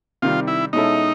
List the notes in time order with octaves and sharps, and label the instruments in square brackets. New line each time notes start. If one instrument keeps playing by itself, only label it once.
[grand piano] C3 D#3 G3 [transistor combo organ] F4
[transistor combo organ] E4
[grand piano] B2 G#3 C#4 E4 A4 [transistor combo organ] D#4